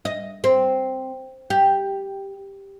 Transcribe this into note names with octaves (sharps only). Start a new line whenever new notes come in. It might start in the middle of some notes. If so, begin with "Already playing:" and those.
D#5
C4
G4